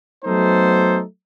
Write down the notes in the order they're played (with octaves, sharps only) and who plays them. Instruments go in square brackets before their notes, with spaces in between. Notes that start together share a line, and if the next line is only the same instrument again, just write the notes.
[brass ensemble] F#3 A3 B3 D#4 A4 C5